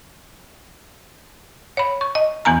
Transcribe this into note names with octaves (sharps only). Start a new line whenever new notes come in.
C#5 B5
C#6
D#5
E2 E3 B3 G#5 A#5